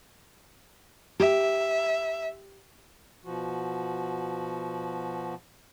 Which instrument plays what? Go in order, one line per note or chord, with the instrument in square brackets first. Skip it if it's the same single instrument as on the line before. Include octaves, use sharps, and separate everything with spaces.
[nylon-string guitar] G4 [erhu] E5
[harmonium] B2 F3 F#4